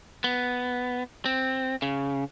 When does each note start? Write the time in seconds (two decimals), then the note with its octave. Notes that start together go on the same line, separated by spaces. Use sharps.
0.24 B3
1.26 C4
1.82 C#3